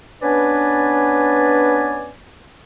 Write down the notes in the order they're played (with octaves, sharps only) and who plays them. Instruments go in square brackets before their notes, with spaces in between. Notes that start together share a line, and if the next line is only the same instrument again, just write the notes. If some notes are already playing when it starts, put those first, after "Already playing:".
[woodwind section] B3 C#4 D4 B4 D5 G#5